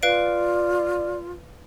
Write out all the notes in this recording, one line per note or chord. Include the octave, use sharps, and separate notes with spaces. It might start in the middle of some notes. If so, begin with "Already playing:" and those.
F4 B4 D5 F5 D7